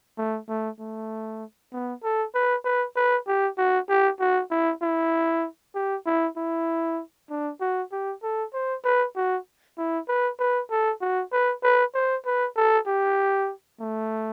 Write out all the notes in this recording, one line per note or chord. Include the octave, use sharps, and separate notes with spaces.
A3
A3
A3
B3
A4
B4
B4
B4
G4
F#4
G4
F#4
E4
E4
G4
E4
E4
D4
F#4
G4
A4
C5
B4
F#4
E4
B4
B4
A4
F#4
B4
B4
C5
B4
A4
G4
A3